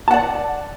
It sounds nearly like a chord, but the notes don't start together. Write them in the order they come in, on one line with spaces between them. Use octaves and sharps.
A5 F#5 D5